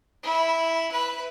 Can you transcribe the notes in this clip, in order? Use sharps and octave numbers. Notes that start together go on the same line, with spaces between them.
E4
B4